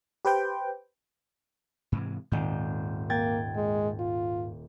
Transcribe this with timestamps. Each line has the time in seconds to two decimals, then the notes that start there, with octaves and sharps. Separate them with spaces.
0.25 G4 B4 C5 G5
1.92 G#2 C3 E3
2.32 D#1 G#2 C4 G6
3.10 A#3 G5 G#6 A6
3.56 G#3
4.00 F4